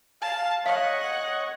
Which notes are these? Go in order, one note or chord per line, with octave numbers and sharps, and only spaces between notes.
F5 A5
C#5 D#5 F5 F#5